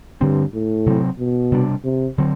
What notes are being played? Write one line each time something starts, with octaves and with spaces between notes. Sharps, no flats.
G2 D3 A3 C4
A2
C3 F#3 C4
B2
C3 G3 D4
C3
D3 F#3 C4